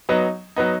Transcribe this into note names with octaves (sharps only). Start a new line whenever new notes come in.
F#3 B3 D#4
F#3 B3 D#4